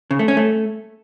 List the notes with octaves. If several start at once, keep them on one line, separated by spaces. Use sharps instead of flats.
C#3
A3
C#4
A3